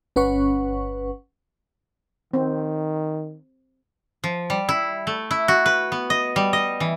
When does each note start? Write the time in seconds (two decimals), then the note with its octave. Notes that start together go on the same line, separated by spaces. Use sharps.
0.16 G1 C#4 B4 F#5 C#6
2.33 D#3 C4
4.24 F3
4.50 G3
4.69 E4
5.07 A3
5.31 E4
5.48 F#4
5.66 B4
5.92 B3
6.10 D#5
6.36 G3
6.53 D#5
6.80 E3